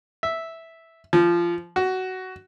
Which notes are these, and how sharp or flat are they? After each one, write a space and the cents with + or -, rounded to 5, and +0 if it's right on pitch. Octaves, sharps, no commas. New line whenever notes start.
E5 -5
F3 -20
F#4 +15